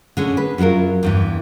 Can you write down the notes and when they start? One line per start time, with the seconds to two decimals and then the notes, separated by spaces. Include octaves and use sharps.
0.17 D3 G#3 C#4
0.37 B4
0.58 F#2 F#3 E4 F4 A#4
1.03 E2 G2 E3